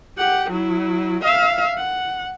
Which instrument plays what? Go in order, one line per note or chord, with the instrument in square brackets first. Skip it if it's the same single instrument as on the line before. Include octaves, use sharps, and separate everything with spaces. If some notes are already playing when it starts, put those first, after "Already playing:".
[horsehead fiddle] G4 F#5
F#3 E4
E5 F5
F#5